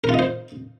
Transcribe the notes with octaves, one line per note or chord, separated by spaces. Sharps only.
F4 A#4 C5 D#5